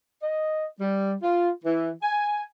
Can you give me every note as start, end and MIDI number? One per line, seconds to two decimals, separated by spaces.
0.23 0.66 75
0.80 1.13 55
1.22 1.50 65
1.64 1.91 52
2.03 2.43 80